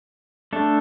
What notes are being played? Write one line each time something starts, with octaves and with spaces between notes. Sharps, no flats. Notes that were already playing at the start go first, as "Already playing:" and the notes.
A3 D4 A4